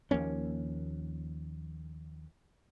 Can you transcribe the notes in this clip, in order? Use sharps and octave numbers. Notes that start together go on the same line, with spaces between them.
D#2 F3 A#3 C#4